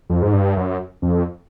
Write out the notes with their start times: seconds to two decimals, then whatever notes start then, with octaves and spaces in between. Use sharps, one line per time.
0.10 F2
0.22 G#2
0.33 G2
0.57 F#2
1.02 F2